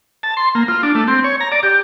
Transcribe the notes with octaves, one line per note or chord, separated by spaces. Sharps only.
A5
C6
A#3
F4
D4
A3
C4
C#5
A#5
D5
G4